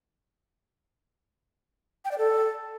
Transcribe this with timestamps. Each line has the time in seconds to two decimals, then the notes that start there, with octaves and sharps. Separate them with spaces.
2.05 G5
2.12 D5
2.18 A4